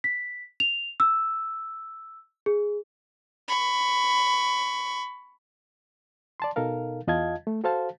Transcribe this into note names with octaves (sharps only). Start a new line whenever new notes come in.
B6
F7
E6
G#4
B5 C#6
D5 A5 C6
B2 D#4 A4 A#4 F5
E2 F4 D#5 F5 A5 G#6
A3
F#4 A4 C5 F5 A5